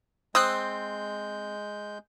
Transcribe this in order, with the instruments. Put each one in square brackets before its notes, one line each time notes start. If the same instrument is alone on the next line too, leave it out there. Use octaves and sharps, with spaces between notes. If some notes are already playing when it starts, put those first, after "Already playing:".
[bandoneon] G#3 G6 [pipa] C4 [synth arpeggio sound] D#6 E6 F#6